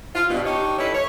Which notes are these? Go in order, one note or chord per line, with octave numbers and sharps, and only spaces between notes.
F4
G2 B2
D4 D#4 G4 C#5
G3 C#4 D#4 E4 A4 B4
C#5